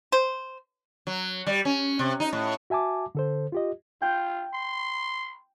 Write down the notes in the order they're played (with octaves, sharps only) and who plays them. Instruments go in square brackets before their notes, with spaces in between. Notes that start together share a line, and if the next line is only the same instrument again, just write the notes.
[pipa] C5
[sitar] F#3
G3
C#4
C3
D#4
A2
[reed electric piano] F#4 E5 G#5 A5 D6
D3 A4 C5
F4 G4 D#5
[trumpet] F4 [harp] G5 G6
[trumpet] C6